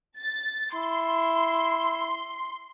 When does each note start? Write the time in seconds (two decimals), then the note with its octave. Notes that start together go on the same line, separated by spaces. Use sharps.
0.18 A6
0.75 E4 C6